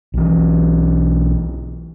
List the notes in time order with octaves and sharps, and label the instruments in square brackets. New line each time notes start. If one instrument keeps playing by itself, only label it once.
[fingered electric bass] B1 E3